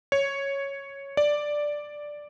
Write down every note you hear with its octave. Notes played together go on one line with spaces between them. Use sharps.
C#5
D5